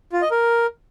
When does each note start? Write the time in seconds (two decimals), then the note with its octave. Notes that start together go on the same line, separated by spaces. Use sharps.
0.13 F4
0.22 D#5
0.31 A#4